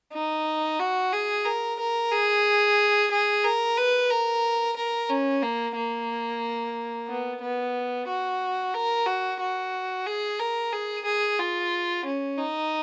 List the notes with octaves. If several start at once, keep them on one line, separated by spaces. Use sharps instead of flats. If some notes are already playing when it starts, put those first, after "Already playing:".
D#4
F#4
G#4
A#4
A#4
G#4
G#4
A#4
B4
A#4
A#4
C#4
A#3
A#3
B3
B3
F#4
A#4
F#4
F#4
G#4
A#4
G#4
G#4
F4
C#4
D#4